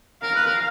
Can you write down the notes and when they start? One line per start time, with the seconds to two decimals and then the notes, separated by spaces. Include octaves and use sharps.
0.22 A#4 F5
0.35 B4
0.46 A#4